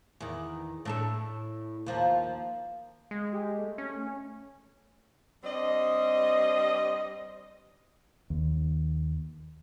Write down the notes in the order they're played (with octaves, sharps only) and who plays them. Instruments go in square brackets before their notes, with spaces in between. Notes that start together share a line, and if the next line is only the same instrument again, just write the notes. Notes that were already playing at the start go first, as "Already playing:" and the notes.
[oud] E2 D#3
A2 D4 A4
D#2 F3 A#3
[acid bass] G#3
[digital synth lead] G4
A3
[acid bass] C#4
[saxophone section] G2 G3 C4 D#5
[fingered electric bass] D#2